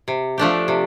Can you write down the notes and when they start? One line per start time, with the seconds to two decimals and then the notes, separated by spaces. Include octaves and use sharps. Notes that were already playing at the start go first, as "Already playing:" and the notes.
0.08 C3
0.38 F3 A3 D4 G4
0.68 C3